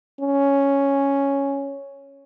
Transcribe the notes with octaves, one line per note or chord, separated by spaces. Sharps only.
C#4